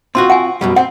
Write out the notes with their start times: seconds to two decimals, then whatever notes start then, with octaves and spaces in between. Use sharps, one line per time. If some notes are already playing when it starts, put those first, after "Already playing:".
0.15 C4 F4 F#4 C6
0.30 F#5 G#5
0.61 F#2 B2 G3
0.76 C4 F#5